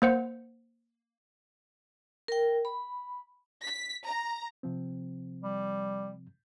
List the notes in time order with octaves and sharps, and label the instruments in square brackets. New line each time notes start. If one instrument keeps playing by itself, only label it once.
[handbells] A#3 C5 F#5
[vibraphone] A#4 G5
B5
[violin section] B6
A#5
[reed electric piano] C3 F3 C4
[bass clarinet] G3